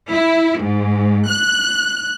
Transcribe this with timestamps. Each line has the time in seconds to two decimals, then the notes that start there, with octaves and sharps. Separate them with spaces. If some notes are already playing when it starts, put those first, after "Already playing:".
0.11 E4
0.59 G#2
1.28 F#6